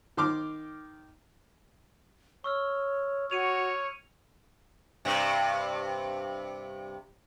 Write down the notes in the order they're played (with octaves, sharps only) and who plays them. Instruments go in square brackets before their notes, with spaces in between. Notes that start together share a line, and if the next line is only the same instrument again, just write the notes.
[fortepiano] D#3 C6 D6 F6
[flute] C#5 [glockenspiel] C#6 E6 F6
[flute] F#4 [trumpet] C#5 [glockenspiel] C#7 D#7 F7
[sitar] G2 C3